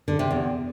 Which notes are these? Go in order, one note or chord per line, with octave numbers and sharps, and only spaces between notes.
D3
C3
E2